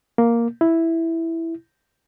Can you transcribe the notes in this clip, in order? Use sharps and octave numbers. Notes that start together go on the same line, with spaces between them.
A#3
E4